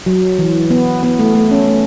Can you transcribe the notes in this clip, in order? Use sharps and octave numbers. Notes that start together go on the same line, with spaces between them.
F#3
E3
B3
B3
A3
A3
C#4
A3